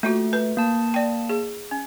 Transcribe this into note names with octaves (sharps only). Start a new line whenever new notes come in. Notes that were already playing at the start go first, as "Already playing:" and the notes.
A3 A#3 F4 F#4
B4
A#3 A5
D5 G5
G#4
C#4